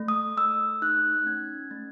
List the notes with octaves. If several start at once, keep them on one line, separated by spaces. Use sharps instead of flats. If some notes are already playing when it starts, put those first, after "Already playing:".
Already playing: A3
D#6
A3 E6
D#4 F#6
C#4 G#6
A3 A6